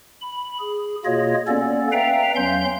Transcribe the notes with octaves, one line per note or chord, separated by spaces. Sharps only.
B5
G#4
B2 A#3 F4 G#4 C#5 D#5
A#3 B3 C#4 A4 D5
B4 E5 F5 G5 A#5
E2 F#3 C#4 F5 C6 G6